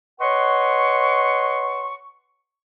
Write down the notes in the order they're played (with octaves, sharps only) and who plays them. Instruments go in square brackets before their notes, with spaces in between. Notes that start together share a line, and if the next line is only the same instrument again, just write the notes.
[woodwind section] B4 C#5 D#5 F#5 C6 C#6